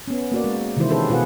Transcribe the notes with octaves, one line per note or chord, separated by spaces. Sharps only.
B3 C#4
A#3 F#4 D5
G#3
C3 D#3 E3 G#3 E4 C5
C#4 G4 A4 B4 C5
B2 F4 G#4 B4 F#5